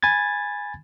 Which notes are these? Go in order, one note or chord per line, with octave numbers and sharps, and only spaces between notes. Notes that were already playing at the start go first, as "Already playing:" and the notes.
G#5 B5 G#6 A6